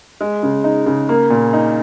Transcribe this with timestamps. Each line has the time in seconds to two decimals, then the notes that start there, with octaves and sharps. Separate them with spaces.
0.21 G#3
0.43 C#3
0.64 D#4
0.86 C#3
1.09 A#3
1.30 A#2
1.53 D#4